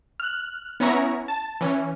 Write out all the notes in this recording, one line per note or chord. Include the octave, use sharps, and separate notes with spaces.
F6 F#6
B3 C#4 E4 A#5 C#6
A5
E3 C#4